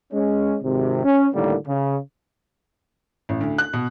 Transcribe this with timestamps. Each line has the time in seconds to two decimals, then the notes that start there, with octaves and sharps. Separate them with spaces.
0.12 G#3 C#4
0.63 G#1 C3
1.04 C#4
1.34 A2 D3 D#3 G3 A#3
1.67 C#3
3.29 A1
3.41 D2
3.58 F#6
3.73 B2